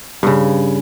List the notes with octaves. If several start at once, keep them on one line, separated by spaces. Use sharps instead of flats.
G2 C#3